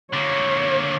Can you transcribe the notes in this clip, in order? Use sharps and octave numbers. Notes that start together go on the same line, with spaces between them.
D3 A#3 C#5